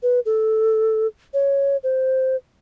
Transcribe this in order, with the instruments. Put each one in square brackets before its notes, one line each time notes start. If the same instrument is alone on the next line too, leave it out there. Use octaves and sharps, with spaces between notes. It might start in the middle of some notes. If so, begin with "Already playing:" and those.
[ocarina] B4
A4
C#5
C5